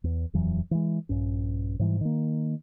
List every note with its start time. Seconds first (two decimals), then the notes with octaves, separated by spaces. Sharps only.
0.04 E2
0.34 D#1 F2 E3 F#3
0.71 E3 G#3
1.09 A#1 G2 C#4
1.79 G#2 E3 G3
2.01 D#3 A#3